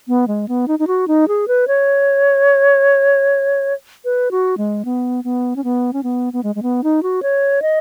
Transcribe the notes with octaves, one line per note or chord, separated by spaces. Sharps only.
B3
G#3
B3
D#4
D#4
F#4
D#4
G#4
B4
C#5
B4
F#4
G#3
B3
B3
C#4
B3
C#4
B3
B3
G#3
G#3
B3
D#4
F#4
C#5
D#5